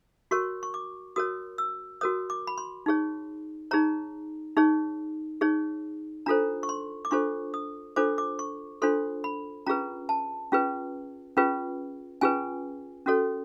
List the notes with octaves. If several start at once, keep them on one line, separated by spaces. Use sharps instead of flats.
F#4 A#4 C#5 C#6
C#6
D6
F#4 A#4 C#5 D#6
E6
F#4 A#4 C#5 D#6
D6
B5
C6
D#4 G#4 C#5
D#4 G#4 C#5 A#5
D#4 G#4 C#5
D#4 G#4 C#5
D4 F4 A4 C5 A#5
C#6
C6
D6
D4 F4 A4 C5 C#6
D#6
D4 F4 A4 C5 D6
D6
C#6
D4 F4 A4 C5 C6
B5
C#4 F4 G#4 B4 A#5
A5
C#4 F4 G#4 B4
C#4 F4 G#4 B4
C#4 F4 G#4 B4 G#5
C#4 F#4 A4 C#5